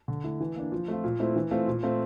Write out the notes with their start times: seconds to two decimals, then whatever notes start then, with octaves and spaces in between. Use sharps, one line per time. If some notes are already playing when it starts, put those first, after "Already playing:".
0.08 D3
0.24 A3 E4
0.40 E3
0.56 A#3 D4
0.72 F3
0.88 A3 C4 F4
1.04 A#2
1.20 A3 C4 E4
1.36 E3
1.51 A3 C4 F4
1.67 A#2
1.83 A3 C4 F4